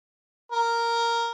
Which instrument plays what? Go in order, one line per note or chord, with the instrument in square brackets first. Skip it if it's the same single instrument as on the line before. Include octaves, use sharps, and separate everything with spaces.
[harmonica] A#4